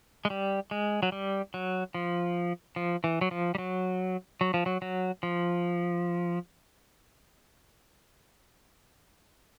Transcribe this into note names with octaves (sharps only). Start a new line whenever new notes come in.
G#3
G3
G#3
F#3
G3
F#3
F3
F3
E3
F#3
F3
G3
F#3
F#3
F3
F#3
F#3
F3